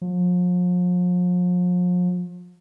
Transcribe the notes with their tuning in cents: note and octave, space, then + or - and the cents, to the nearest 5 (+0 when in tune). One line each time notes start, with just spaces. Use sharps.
F3 +40